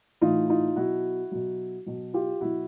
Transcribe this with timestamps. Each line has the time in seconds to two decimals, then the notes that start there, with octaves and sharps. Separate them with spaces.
0.21 A2 E3 D#4 F4
0.50 D#4 F4
0.76 B2 F#3 E4 F#4
1.32 B2 F#3
1.86 B2 F#3
2.14 F4 G4
2.41 B2 F#3 E4 F#4